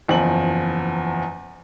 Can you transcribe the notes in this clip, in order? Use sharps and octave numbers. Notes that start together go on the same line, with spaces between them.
F#1 E2 F3 F#7